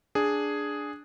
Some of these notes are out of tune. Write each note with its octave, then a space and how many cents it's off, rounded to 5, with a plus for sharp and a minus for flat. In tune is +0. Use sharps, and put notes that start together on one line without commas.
D4 +0 G#4 +0